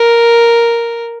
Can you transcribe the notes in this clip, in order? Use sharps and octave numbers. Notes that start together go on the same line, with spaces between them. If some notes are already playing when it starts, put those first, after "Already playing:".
Already playing: A#4